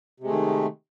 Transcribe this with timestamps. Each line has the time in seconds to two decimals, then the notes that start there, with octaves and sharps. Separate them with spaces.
0.20 C3
0.23 G#3
0.27 A3
0.30 D#3